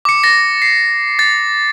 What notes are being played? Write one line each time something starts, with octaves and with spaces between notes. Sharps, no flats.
D6 C#7
A6 A#6
C7
A6